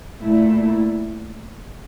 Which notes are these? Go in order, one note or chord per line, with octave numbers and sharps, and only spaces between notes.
A#2 A3 E4